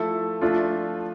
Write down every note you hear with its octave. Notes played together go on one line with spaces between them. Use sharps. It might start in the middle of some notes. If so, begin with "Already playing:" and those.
Already playing: F3 A3 E4 A4
F3 A3 D4 F4